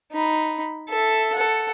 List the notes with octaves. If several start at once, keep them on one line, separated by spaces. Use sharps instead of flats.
D#4 B5
A4 E5
A4 F#5